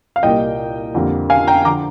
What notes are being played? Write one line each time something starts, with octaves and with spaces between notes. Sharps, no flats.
F5
C2 A#2 G3 A#3 D#5 G5
F2 D3 G3 A#3
F5 G#5
G5 A#5
D3 F3 A#5 D6